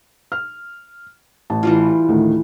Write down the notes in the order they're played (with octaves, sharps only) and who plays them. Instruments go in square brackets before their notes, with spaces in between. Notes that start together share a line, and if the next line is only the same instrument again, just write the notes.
[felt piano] F6
A1 A5
[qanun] E3 G3 F4
[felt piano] D2 A2 D#3